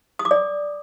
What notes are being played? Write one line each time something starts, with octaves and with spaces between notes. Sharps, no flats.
D#6
D6
D5